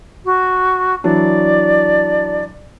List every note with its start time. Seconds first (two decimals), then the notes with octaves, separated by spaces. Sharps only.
0.25 F#4
1.04 E3 F#3 D4 D5